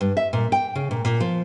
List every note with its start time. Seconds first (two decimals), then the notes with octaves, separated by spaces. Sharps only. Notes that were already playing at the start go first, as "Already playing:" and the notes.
0.01 G2
0.17 E5
0.33 A#2
0.52 G5
0.75 C#3
0.91 A#2
1.05 A#2
1.20 F3